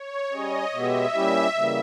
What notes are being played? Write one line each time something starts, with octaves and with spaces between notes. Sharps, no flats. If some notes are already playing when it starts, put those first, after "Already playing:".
Already playing: C#5
G3 C#4 G#4 D#5
B2 G#3 B3 G4 E5
A#2 G3 C#4 E4 G4
C#3 E3 G3 A#3